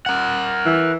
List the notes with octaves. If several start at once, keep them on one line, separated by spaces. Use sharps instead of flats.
A#4 F#5
E3